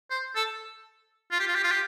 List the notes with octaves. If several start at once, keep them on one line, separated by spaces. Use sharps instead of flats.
C5
A4
F4
G4
F4
G4
F4
G4